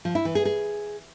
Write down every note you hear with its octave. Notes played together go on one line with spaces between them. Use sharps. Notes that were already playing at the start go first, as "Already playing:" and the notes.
F3
E4
E3
G#4
G#4